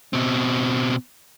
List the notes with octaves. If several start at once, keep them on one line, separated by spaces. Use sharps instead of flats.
B2 C4